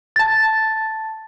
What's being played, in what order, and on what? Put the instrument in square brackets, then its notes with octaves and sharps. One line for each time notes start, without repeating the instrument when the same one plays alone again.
[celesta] A5 A6